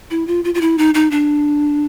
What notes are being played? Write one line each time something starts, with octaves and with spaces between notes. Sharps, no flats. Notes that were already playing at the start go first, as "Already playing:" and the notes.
E4
F4
F4
F4
E4
D#4
D#4
D4